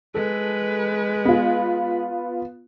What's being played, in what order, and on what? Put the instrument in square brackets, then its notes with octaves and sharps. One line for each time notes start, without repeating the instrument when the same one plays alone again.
[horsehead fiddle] G#3 B4 [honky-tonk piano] A4
[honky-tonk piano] B3 F4